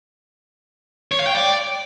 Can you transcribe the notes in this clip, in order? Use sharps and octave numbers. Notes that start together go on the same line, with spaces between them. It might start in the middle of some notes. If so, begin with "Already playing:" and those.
C#5
F5
G5
D5